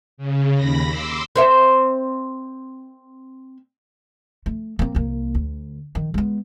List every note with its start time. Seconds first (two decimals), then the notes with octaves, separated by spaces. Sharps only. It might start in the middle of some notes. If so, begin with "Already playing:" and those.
0.17 C#3
0.54 D#2 B5 A#6
0.88 C6 D6 E6
1.36 C4 C5 E5
4.46 A3
4.79 A#3 C4
4.95 C2 A#3
5.35 D2
5.95 D#3
6.14 G#3 B3